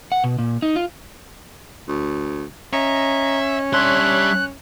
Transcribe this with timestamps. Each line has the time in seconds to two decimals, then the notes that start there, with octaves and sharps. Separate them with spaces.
0.12 F#5
0.24 B2
0.39 A#2
0.62 D#4
0.76 F4
1.88 D2
2.73 C#4 D#5 E5 A#5
3.73 G3 D4 C#5 E5 C6 F#6